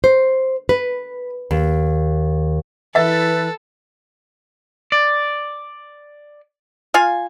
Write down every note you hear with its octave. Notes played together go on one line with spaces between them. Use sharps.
C5
B4
D#2
E3 A4 B4 E5 A6
D5
F4 F5 G#5